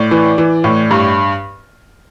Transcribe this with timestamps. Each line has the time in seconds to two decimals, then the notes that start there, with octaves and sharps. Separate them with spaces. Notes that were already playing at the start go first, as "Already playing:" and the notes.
Already playing: A2 D5
0.11 E3
0.38 E3
0.64 A2
0.91 G2